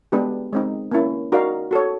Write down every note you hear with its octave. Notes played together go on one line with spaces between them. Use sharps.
G#3 B3 D4 G4 B4
G#3 C4 D#4
A#3 C#4 E4
D#4 F#4 A#4 D5 F5
F#4 A4 C#5